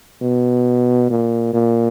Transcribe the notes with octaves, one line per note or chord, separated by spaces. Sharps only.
B2
A#2
A#2